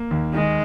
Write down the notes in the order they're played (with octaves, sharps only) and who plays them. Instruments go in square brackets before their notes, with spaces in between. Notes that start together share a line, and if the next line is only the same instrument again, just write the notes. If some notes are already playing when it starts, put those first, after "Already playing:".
Already playing: [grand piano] A#3
D#2
[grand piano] D#3 [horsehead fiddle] G#3